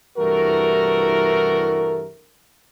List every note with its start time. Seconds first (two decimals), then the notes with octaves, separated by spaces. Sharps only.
0.18 C2 G2 E3 A3 F#4 A#4